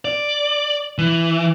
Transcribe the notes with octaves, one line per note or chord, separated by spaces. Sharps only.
D5
E3